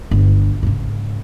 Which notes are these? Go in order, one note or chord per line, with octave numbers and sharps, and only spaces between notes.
G1
G#2 C#3